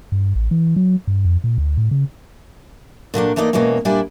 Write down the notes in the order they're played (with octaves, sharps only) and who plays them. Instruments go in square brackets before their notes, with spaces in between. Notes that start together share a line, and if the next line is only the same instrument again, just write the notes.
[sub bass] G2
A1
E3
F#3
G2
F2
A#2
D2
A2
C#3
[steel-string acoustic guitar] A#2 F#3 A3 D4
E3 A3 A#3 D#4 D5
B2 E3 G#3 A#3 C#4
A#2 G3 D4 E4 G#5